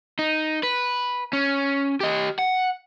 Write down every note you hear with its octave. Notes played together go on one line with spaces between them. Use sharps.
D#4
B4
C#4
G4 D#5
F#5